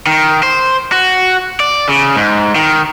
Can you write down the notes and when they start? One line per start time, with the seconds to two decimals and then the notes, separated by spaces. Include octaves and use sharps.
0.07 D#3
0.43 C5
0.92 F#4
1.60 D5
1.89 C#3
2.16 G#2
2.55 D#3